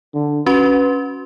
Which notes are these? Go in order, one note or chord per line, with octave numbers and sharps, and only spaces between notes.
D3
C#4 F#4 B4 C6